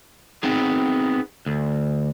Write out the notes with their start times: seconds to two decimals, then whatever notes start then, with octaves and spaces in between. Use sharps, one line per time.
0.43 B3 C4 D#4 G#4
1.46 D2